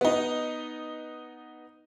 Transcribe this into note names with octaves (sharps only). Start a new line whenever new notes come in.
B3 D#4